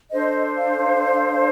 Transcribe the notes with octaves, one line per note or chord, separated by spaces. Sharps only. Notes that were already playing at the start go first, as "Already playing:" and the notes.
D4 A4 C5 D#5
F5